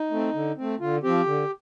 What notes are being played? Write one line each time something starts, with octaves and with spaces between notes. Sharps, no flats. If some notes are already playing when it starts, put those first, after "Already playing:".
Already playing: D#4
A3 C4
D3
A3 C4
D3 F4
F3 C4 G4
D3